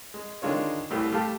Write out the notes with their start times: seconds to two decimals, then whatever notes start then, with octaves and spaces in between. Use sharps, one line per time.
0.14 G#3
0.42 D3 D#3 G#3 D4 F4 C#5
0.90 C2 A2 G3 A3
1.12 G3 A3 G4 F5 A5